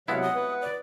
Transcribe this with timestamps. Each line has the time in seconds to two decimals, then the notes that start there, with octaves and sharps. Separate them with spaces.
0.08 C3 F#3 G#3 B3 E4 F5 F#5
0.22 D#6
0.35 B4
0.62 D5